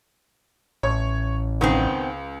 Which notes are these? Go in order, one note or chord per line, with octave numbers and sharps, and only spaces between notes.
A1 C#5
C#2 D#3 B3 C4